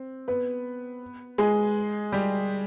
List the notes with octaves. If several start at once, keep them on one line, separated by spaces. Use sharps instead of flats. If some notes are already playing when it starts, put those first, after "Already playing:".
Already playing: C4
B3 B4
G#3 G#4
G3 G4